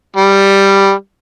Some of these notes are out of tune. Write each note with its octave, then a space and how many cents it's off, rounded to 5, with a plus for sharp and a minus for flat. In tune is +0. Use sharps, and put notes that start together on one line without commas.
G3 +5